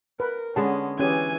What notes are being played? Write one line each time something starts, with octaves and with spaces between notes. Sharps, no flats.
A#4 B4
D3 G#3 B3 C#4 A5
E3 C#4 G4 G#4 G#5